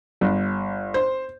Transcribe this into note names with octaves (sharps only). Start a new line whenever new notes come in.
G1
C5